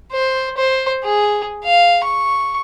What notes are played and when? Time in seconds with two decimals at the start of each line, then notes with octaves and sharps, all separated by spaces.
0.12 C5
0.57 C5
1.04 G#4
1.64 F5
2.04 C#6